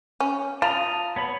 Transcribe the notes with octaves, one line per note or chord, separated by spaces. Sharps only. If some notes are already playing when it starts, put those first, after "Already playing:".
C#4
F4 A5 A#5 D#6
B3 C#5 B5